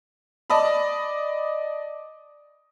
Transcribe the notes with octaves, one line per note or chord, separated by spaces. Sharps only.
D5 D#5 A5 B5